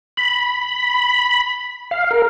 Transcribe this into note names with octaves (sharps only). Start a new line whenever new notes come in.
B5
F5
A#4